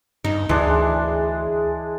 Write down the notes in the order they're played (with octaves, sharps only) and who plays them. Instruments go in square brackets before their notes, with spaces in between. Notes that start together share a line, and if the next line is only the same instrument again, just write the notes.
[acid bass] G2 [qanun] D#4
[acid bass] D2 [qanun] E3 [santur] G#3 D4 [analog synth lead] G#4